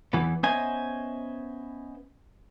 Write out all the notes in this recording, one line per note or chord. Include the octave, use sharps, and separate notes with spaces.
E2 E3 B3
B3 C#4 C5 D#5 E5 G#5